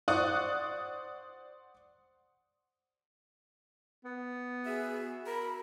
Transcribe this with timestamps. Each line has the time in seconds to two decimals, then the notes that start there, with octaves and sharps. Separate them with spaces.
0.08 C5 D5 F#5 C#6 D#6 F#6
4.05 B3
4.66 F#4 G#4 E5
5.27 A#4 B5